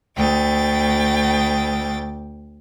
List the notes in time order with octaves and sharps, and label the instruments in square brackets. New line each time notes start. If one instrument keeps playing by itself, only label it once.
[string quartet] D2 G5 A6